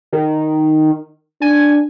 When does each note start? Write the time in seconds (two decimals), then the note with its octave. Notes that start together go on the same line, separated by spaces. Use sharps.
0.13 D#3
1.42 D4 G#5